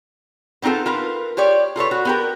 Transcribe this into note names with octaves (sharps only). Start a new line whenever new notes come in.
B3 C4 D#4 F4 A4
F4 A#4 B4
F4 G4 C#5 D5
F4 A4 B4 C#5
F#4
B3 G4 A#4